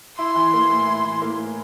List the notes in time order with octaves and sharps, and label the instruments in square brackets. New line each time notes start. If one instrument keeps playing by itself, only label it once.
[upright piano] E4 [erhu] C6
[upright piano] E3
A#3
A2
E4
E3
A#3
A2